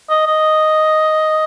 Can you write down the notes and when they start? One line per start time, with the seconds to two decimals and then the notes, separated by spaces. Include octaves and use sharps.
0.10 D#5
0.27 D#5